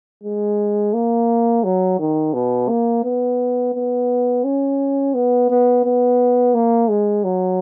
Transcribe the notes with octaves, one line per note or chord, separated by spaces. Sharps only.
G#3
A#3
F#3
D#3
B2
A#3
B3
B3
C#4
B3
B3
B3
A#3
G#3
F#3